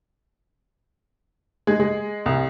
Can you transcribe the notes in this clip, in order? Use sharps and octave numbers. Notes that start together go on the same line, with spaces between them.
G#3
G#3
C2